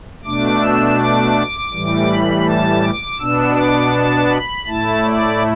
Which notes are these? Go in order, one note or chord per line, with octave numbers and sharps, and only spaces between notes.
B2 A3 D4 D6
E6
D6
A2 E3 G3
B5
A5
D6
B2 B3 D4 E6
D6
A5
B5
A2 A3 E4 A5
D5